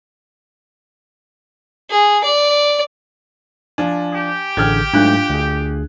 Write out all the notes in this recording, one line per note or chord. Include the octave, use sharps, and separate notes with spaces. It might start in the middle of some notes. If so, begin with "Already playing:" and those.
G#4
D5
F3 D4 G#5
G4
A1 D3 G#4 G5 F6 G#6
G#2 F#3 A3 D4 F4 F#6
D2 G#4